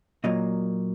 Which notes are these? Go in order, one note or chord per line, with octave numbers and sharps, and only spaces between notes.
A#2 F#3 A#3 D#5